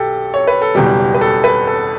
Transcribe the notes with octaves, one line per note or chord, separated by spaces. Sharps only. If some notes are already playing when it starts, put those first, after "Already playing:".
Already playing: B1 G4 A4
C#5
B4
A4
F#1 E2 B2 G3 G4
B4
A4
B4
A4